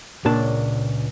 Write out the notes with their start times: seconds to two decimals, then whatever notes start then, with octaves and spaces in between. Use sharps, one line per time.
0.25 C#2 A#2 A#3 D4 C#5 A5